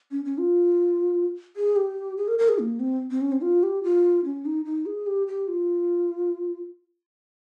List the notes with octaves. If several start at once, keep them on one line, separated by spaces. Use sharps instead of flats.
C#4
C#4
F4
G#4
G4
G#4
A#4
A#4
G#4
A#3
C4
C4
C#4
C4
F4
G4
F4
C#4
D#4
D#4
G#4
G4
G4
F4